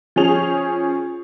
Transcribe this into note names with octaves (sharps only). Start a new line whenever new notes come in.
F3 C#4 G#4 F7